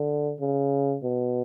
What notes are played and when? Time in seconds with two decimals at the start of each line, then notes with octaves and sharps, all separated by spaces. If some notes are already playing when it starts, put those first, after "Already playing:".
Already playing: D3
0.40 C#3
1.03 B2